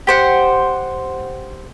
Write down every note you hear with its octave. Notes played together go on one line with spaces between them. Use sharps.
G4 C5 F#5